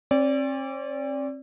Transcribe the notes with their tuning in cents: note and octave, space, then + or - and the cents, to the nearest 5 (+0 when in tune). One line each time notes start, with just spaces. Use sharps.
C4 +40 D5 -20